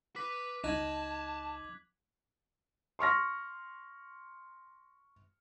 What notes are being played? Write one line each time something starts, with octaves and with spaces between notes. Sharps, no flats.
B4 D6 B6
C#2 D#4 A5 F#6 G#6 F#7
C6 C#6 F6 A#6